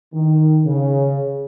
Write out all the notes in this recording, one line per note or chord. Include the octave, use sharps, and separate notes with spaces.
D#3
C#3